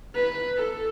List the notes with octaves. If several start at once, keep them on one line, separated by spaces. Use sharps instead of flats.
B4
A4